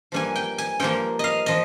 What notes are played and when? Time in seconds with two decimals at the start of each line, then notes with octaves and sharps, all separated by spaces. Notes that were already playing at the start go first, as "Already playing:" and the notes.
0.12 G2 F3 A#3 G#5
0.36 G5
0.58 G#5
0.80 G2 F3 A#3 G5
1.19 D#5 F5
1.46 F3 D#5